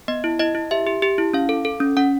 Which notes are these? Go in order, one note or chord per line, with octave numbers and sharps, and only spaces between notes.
B3 D#5
E4
E4 D#5
E4
G4 E5
G4
G4
E4
C#4 F5
A4
A4
C#4
C#4 F#5